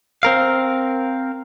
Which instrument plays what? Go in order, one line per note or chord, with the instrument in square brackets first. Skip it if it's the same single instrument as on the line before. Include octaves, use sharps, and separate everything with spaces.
[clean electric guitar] C4 A#4 F5